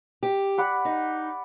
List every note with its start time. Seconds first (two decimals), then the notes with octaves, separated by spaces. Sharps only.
0.23 G4
0.58 D5 F#5 B5
0.85 D#4